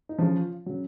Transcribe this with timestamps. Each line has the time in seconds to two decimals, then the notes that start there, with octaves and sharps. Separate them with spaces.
0.09 D#4
0.19 C#3 F3 F4
0.66 C#3 F#3